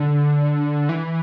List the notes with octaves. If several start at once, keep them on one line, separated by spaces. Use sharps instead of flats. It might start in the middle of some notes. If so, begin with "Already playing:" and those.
Already playing: D3
E3